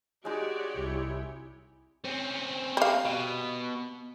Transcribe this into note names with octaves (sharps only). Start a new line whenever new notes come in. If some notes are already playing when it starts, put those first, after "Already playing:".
G#3 D#4 F#4 G4 C#5 D5
C2 E4
C4 C#4
G3 F5
B2